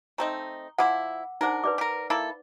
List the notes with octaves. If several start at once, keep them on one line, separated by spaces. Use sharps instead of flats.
A3 C4 D#4 A#5
F3 E4 F#5 D6 E6
D4 D#4 A#4 C5 F#5
B4 D5 D6
G4 A#4
A#3 E4 A4